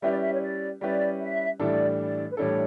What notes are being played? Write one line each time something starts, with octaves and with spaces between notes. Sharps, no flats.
G3 C#4 E4 G4 B4 E5
D5
E5
C#5
D5
G3 C#4 E4 G4 B4 D5
E5
A2 E3 G3 D4 A4 D5
D5
B4
A2 E3 G3 D4 A4 C#5